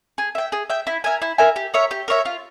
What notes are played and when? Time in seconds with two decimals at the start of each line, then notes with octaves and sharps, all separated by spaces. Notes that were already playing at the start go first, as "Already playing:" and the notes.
0.18 G#4
0.35 E5 G5
0.52 G#4
0.70 E5 G5
0.87 E4
1.04 A#4 E5 G#5
1.22 E4
1.38 A#4 E5 G#5
1.56 G4
1.74 A#4 C#5 E5
1.91 G4
2.08 A#4 C#5 E5
2.25 F4